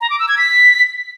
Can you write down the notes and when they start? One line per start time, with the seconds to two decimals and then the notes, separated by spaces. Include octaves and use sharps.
0.01 A#5
0.10 D6
0.19 E6
0.28 G#6
0.38 B6